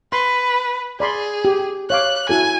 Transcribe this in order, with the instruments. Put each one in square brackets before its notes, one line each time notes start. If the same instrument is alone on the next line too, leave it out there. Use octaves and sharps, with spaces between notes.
[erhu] B4 [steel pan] C6
[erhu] G#4 [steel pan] D5 B5 C6
[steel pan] G4
[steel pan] C#5 F5 D6 [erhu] F#6
[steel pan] E4 F#4 A4 [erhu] G#5